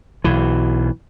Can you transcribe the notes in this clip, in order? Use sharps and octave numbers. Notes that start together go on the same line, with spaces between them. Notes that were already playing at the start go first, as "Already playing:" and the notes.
B1 E3